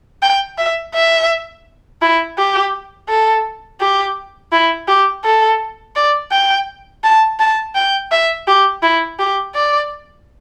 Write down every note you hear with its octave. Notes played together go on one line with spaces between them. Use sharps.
G5
E5
E5
E4
G4
A4
G4
E4
G4
A4
D5
G5
A5
A5
G5
E5
G4
E4
G4
D5